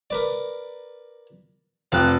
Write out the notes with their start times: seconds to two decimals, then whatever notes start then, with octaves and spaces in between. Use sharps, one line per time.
0.10 A#4 B4 D5
1.92 F1 C4 F4 G4 F#6